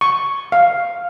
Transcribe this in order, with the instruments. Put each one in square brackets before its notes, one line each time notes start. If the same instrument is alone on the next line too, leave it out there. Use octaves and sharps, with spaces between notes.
[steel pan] C#6
F5